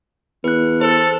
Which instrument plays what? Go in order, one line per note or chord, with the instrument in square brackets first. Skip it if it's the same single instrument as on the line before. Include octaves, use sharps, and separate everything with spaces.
[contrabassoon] E2 [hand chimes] B4 F#6
[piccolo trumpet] A4 [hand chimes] C5